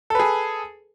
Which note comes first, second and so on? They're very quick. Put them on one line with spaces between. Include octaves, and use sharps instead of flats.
A4 B4 G#4